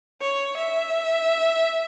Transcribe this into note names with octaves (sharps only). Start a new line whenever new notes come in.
C#5
E5